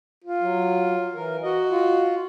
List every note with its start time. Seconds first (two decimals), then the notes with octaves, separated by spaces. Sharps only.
0.24 F4
0.41 F#3
1.14 E3 A#4
1.42 F#4 D#5
1.70 F4